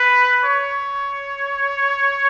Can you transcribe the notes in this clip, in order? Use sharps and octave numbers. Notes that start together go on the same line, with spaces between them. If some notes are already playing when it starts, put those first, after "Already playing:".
Already playing: B4
C#5